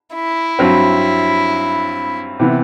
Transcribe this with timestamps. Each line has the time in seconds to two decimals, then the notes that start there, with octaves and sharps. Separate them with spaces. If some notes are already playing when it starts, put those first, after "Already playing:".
0.15 E4
0.59 G2 F#3 C4
2.39 C3 E3 B3